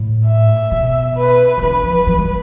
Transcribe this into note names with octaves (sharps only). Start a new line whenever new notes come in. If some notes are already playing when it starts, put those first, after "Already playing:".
Already playing: A2
E5
B2
B4
C3
D3 B4
F3
F3
G3